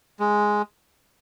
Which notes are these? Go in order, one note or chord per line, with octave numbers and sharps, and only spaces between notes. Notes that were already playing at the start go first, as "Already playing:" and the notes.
G#3